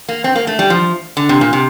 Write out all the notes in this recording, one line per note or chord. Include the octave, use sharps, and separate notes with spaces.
A#3
C4
A#3
A3
G3
F3
D3
C3
A#2
C3